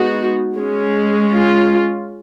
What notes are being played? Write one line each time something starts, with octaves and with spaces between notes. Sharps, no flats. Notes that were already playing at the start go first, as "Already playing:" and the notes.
Already playing: G#3 B3 D#4 F#4
G#3 C#4
F4